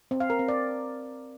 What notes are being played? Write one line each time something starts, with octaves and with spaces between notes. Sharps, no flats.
C4
F5
A#4
C4
D5